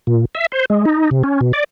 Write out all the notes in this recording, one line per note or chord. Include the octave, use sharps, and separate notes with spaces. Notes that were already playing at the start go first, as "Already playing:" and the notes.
A#2
E5
C5
G#3
D#4
C3
C#4
B2
D5